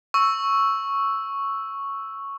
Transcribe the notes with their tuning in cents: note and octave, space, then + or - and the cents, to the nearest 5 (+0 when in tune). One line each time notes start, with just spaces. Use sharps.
C#6 +0 E6 +0